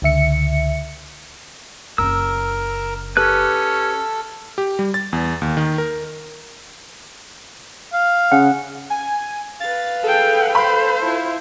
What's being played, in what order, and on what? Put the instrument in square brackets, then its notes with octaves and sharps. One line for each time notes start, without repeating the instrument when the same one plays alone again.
[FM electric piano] C#2 D3 E5 C#7
[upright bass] F#1 C#3 [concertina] A#4 [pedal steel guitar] E6
[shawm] C#4 [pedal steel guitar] G4 B4 F#6 [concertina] A4
[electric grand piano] G4
G3
A6
E2
D#2
D#3
A#4
[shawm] F5
[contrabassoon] C#3 [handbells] F#5
[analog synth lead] G#5
[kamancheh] B4 F5 [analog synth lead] A6
[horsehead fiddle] G#4 G5 [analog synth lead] A4
[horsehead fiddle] C5 [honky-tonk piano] B5
[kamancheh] E4 F4